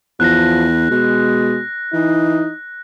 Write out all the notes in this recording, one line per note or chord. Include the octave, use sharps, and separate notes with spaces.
E2 F3 F#6 A#6
B2 G#3
E3 D#4